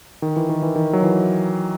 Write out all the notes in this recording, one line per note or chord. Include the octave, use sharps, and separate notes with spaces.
D#3
E3
D#3
E3
D#3
F#3
E3